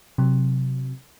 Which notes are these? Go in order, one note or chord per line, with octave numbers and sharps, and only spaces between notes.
C3 F#3